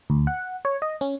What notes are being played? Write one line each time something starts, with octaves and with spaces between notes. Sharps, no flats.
D2
F#5
C#5
D#5
C#4